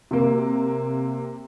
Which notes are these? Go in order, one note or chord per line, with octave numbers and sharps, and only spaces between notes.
C3 A#3